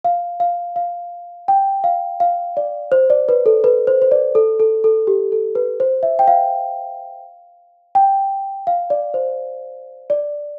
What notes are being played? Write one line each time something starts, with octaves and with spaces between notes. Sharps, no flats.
F5
F5
F5
G5
F5
F5
D5
C5
D5
B4
A4
B4
C5
C5
D5
A4
A4
A4
G4
A4
B4
C5
E5
G5
F5
G5
F5
D5
C5
D5